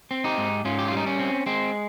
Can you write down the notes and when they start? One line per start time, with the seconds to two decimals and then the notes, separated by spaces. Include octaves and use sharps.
0.11 C4
0.24 D#4 G4
0.38 G#2
0.65 G#2 C#4 F4
0.79 G4
0.88 F4
0.92 G3 D#4
1.06 C#4
1.19 C4
1.46 G#3 C4